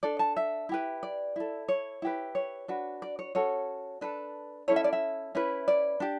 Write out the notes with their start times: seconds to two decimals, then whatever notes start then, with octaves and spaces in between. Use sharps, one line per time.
0.03 D4 A4 D5
0.19 A5
0.37 E5
0.69 E4 G4 B4
1.03 D5
1.36 E4 A4
1.68 C#5
2.02 E4 G4 B4
2.35 C#5
2.68 D4 F#4 B4
3.02 D5
3.19 C#5
3.35 C#4 F#4 A4 C#5
4.01 D4 A4 B4
4.68 C#4 E4 A4 C#5
4.76 E5
4.84 D5
4.93 E5
5.35 C#4 E4 B4
5.68 D5
6.00 D4 G4